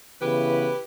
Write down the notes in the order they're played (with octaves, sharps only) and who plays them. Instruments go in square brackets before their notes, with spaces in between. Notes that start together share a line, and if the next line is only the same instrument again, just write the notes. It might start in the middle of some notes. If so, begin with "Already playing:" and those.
[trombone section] C#3 E3 B3 [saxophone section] E4 G4 B4